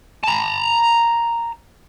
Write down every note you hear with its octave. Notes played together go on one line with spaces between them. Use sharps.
A5 A#5